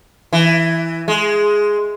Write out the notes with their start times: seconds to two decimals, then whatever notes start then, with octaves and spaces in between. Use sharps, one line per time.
0.33 E3
1.08 G#3